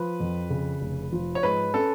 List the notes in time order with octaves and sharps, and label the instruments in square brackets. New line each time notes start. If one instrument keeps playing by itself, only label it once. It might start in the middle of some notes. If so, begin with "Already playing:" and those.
Already playing: [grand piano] F3 [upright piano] B4
[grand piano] F2
C#3
F1
F3
[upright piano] C#5
[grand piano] G#2 [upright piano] B4
[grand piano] C#4 [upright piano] A4